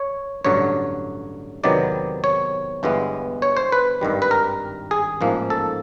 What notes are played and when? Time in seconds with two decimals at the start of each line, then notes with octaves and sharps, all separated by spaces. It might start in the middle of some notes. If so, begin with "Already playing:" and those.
Already playing: C#5
0.45 A1 G2 D3 F#3 C#5
1.63 E2 C3 D#3 F#3 B3 D5
2.24 C#5
2.83 G1 G2 E3 G#3 B3
3.42 C#5
3.57 C5
3.72 B4
4.01 G#1 G2 D#3 G3
4.22 B4
4.31 A#4
4.91 G#4
5.21 A1 G#2 F3 A#3
5.50 A4